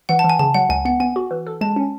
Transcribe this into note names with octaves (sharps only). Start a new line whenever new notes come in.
E3 F#5
A5
E3
G#5
C#3 A5
F#3 F#5
C#2 G#5
B3 F#5
B3 G#5
F#4
E3
A4
G#3 A5
C#4